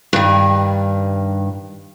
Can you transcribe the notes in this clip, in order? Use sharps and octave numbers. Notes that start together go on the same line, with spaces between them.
G2 D#3